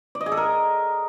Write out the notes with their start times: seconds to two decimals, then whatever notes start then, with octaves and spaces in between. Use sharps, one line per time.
0.15 D5
0.21 D#5
0.26 G#4
0.32 A4
0.37 A#4